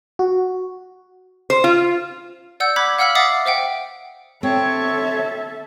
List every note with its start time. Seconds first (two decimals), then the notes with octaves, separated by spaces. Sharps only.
0.19 F#4
1.50 C5
1.64 F4
2.60 D5 F#5 E6 G6
2.76 B5 D6 F#6 G#6 B6
2.98 F5 F#5 E6 F6 B6 F#7
3.15 E5 F#5 D6 D#6 A6 C7
3.46 C5 E5 F#5 G5
4.43 C4 A4 C#5 E5